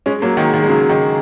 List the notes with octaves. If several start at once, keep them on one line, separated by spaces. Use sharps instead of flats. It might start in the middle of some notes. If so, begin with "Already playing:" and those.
G#3 C#4
F#3 A#3
D#3 G#3
D#3
G#3
C#3 F#3
D#3